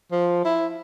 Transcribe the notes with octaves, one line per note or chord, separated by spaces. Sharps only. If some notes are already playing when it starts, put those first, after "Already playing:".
F3
E4